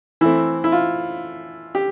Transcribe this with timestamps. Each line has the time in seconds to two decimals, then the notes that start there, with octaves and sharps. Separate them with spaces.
0.21 E3 A3 C4 E4
0.64 E4
0.72 F4
1.75 G4